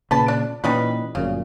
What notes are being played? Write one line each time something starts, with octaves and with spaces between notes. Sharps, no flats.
A#2 C#3 B4 A5
D4
A#2 E3 G3 C#4 D#4 B4
G1 F#2 A#2 C#3